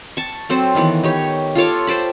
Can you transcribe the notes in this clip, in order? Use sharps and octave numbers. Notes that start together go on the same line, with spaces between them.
A5 C#6
F#3 C4 A4 C5
D#3 E3 B3
D#4 G4 C#5
F4 A4 C#5 D6
C5 G5 A5 B5